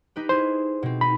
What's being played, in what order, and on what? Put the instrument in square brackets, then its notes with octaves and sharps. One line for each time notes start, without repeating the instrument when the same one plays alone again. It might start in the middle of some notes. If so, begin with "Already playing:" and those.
[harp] D#4 G4 B4
[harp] E4 G#4 [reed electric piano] C5
[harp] B2 C4
[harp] D#4 [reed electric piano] B5